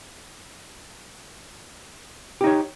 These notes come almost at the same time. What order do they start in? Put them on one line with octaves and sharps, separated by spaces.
G4 D#4 C#5